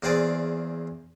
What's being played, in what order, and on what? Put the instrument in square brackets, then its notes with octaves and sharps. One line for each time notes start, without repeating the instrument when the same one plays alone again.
[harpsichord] E2 A#3 C4 G#4 D5